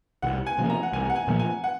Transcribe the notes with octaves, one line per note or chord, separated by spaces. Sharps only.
C2 F#5
G#5
C3 F3 A#3
A#5
F#5
C2 G#5
F#5
G#5
A#2 F3 A#3
G#5
F#5